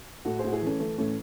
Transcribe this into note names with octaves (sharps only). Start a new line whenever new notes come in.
A2 F#4 A4
A2 F#4 G#4 C5
E4 G#4
E3 A3 C#4
E3 A3
A2 A3 C#4